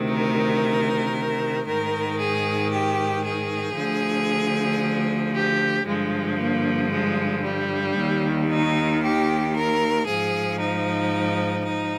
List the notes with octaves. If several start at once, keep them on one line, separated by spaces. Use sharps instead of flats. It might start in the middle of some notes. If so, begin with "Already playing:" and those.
Already playing: D2 C3 D#3
A#4
G#2 D#3 A#4
G#4
G4
G#4
D2 D3 F3
G4
G2 D3 F3 G#3
A#3
G#3
G3
D#2 D#3
D#4
G4
A#4
G#2 F3 G#4
D#4
D#4